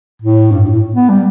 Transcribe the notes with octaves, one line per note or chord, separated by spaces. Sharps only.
A2
G2
A2
B3
G3